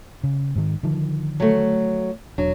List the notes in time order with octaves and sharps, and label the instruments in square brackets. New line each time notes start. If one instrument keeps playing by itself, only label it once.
[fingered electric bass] C#3
G#2 D#3
D3 D#3 F3
[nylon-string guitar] F#3 A3
[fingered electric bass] E1 D4 [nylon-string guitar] F#3